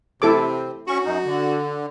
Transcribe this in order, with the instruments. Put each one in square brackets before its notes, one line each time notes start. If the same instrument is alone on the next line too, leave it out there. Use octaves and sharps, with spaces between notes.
[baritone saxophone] C3 [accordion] C4 [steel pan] E4 A4 D6
[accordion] C#4 C#6 [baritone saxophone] F#4
[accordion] F#2 D#4
D3